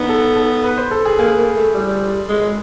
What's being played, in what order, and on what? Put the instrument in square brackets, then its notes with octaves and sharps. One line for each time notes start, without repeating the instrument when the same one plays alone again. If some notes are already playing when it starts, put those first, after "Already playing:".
Already playing: [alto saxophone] B3 [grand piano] D#4
[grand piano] A4
A4
B4
C5
A4
G#4
[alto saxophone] A#3 [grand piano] G#4
[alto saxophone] A#3
A3
G3
G#3